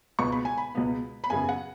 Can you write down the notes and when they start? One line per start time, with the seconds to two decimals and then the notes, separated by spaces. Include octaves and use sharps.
0.19 C#2 B2 B3 C#6
0.32 B5
0.45 G#5
0.58 B5
0.75 C#2 B2 B3
1.24 B5
1.30 F#2 C#3 B3 G#5
1.49 F#5